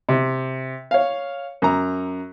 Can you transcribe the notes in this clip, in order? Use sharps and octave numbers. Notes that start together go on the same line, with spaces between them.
C3
C#5 F5
F#2 A#5